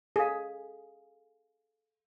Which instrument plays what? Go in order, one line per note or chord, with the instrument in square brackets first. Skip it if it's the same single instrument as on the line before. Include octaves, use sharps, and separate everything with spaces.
[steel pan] G#4 [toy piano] A4 F5